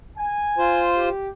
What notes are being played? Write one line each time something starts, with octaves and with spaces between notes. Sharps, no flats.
G#5
F4 C5
G4